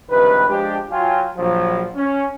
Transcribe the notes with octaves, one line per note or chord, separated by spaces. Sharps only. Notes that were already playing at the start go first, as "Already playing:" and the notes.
C#2 G2 C3 D#3 B4
F3 G#3 D4 G4
F#3 F4 G5 G#5
A#1 F3 F#3
C#4